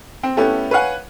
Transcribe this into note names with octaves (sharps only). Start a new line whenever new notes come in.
C4
A3 B3 C#4 E4 G4 A4
B4 C#5 F5 F#5 G#5